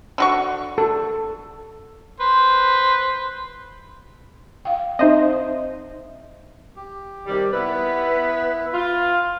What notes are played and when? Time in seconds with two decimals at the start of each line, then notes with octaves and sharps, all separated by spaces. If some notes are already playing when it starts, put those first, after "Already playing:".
0.18 D3 F#4 C#6
0.78 A4
2.20 B4 C5
4.65 F5 G5
4.99 C4 D#4 C5 D#5 E5
6.76 G4
7.27 C3 D#3 G3
7.53 B3 E4 B4 E5
8.74 F4